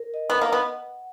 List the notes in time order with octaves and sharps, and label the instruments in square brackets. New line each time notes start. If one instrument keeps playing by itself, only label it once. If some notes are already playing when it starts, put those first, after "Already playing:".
Already playing: [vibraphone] A#4
D#5
[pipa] B3
[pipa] A#3 [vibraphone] F#5
[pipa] B3